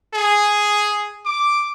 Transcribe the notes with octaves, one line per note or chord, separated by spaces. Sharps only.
G#4
D6